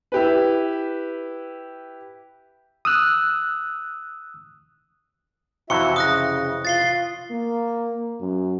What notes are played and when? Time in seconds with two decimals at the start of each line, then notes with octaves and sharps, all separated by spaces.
0.12 E4 G4 B4
2.85 D#6 E6 F#6
5.70 F2 C3 E3 E4 F#4 E5 C#6 C#7
5.96 C#3 D#6 F#6 A#6
6.65 F4 A6 C7 G7
7.31 A#3
8.20 F#2